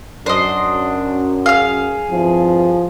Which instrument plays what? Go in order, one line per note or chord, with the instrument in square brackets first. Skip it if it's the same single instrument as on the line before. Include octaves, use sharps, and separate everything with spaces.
[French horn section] F#2 [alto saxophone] D4 [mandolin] C5 D#5
[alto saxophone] G#4 [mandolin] F5 F6
[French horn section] G2 C4 E4 [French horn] F3